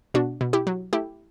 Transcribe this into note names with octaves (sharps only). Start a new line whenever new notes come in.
B2 D4 F#4
B2
E4 G4
F#3
A3 E4 G4